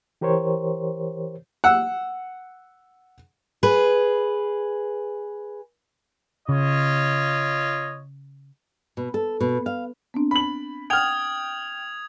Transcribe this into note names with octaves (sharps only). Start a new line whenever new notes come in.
E3 G4 A#4 C5 C#5
F#5 E6
G#4 B4
C#3 F4 C#5 D#5
B2
A4
B2
F5
B3 C4 D4
B5 F#7
F#5 G5 D#6 F6 G#6 F7